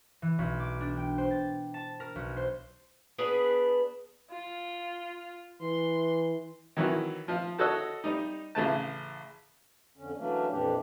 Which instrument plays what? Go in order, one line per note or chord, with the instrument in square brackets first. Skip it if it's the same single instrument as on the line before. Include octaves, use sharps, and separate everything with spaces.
[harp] E3
B1
D6
D4
G5
C5
A6
A5
A#4
B1
C5
[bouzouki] B3 D4 G#4 B4
[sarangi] F4
[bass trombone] E3 [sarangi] C6
[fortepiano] D#3 E3 F#3 E4
F3 F4
F#4 A4 C#5 D#5 E6
G3 D#4
A1 C#3 A3 A5
[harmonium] F2 D3 C#4
E3 F#3 A3 A#3 C#4 D4
F2 A#2 E3 D4 G4